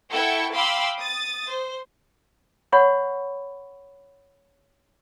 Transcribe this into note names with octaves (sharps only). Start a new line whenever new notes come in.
E4 A4 F#5 G5 C#6 G#6
F5 G5 B5 C6 D6 E6
D#6 A6
C5
C#5 F#5 B5 C#6